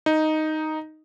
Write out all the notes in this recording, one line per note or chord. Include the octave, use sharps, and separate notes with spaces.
D#4